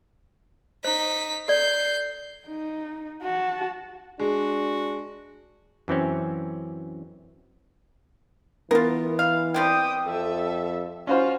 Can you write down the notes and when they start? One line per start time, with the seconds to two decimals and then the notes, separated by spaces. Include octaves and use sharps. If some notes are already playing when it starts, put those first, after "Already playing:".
0.84 D#4 C5 B6
1.48 A4 D5 G6 C7
2.47 D#4
3.22 F#4 A5
4.19 G#3 D4 F#4
5.88 F#2 E3 C4 C#4
8.71 E3 B3 F4 A#4
9.19 F5
9.54 G3 C4 G4 G5 D#6
10.06 F2 A4 E5
11.07 C#4 F4 F#4 C5